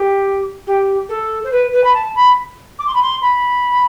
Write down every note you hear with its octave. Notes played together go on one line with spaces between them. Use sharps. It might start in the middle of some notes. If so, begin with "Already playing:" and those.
Already playing: G4
G4
A4
C5
B4
B4
B5
A5
B5
D6
C6
B5
C6
B5